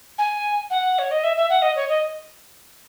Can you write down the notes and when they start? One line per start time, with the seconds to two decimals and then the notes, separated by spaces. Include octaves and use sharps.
0.18 G#5
0.70 F#5
0.98 C#5
1.11 D#5
1.23 E5
1.36 E5
1.49 F#5
1.62 D#5
1.76 C#5
1.89 D#5